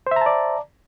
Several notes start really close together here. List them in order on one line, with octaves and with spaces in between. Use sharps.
C5 E5 A#5 A5 D5